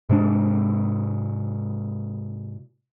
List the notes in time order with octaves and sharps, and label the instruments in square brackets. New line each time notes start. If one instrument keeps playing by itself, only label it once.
[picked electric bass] G#2 C3 G#3 D4